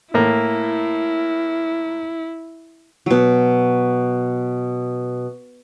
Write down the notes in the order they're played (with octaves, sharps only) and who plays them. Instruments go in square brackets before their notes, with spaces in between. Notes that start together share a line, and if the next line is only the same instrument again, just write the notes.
[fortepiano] A2 A#3 [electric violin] E4
[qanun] B2 F#3